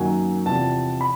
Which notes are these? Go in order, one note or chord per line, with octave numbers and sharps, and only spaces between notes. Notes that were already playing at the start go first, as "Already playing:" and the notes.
Already playing: F#2 D#3 F#3 A#3 G#5
E2 C3 F3 A5
B5